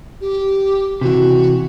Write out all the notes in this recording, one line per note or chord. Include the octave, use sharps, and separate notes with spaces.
G4
C3 E3 F#4